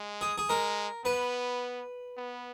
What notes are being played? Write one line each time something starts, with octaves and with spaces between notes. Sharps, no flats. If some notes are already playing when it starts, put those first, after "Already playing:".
Already playing: G#3
G#4
G#4
G#3 A#4
B3 B4
B3